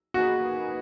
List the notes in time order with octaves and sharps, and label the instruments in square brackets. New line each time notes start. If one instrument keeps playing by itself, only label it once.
[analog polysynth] A#3 D#4 G#4 B4 [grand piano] F#4